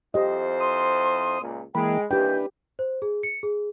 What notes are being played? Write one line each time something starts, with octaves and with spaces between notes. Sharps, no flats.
F2 E4 G4 C5 D#5
C6 D#6
C#2 A#2
E3 G#3 A#3 G5 B5
D#2 E3 D4 G4 B4 G5 G6
C5
G#4
C#7
G#4